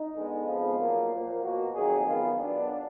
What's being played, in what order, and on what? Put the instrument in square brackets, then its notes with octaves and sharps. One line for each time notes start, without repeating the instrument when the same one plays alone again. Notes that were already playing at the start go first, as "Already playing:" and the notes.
Already playing: [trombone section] D#4
D3 G#3 B3
F2 F3 G#3 B3 F4
A#2 F#3 A#3
A#2 F3 A#3
B2 A#3 F#4
F2 D#3 F#3 A#3 G#4
F#2 D#3 G#3 B3 F4
B2 F#3 B3 D4